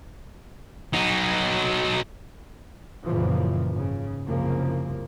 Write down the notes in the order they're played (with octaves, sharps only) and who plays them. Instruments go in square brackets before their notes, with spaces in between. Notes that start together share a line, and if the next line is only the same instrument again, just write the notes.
[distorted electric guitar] F#3 D#4
[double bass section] F#2 A#2 C#3 E3 F3
G#2 C#3
C2 F#2 C#3 F3 A#3